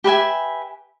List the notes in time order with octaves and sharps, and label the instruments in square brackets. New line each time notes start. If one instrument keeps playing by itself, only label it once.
[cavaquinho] G4 B4 E5 G#5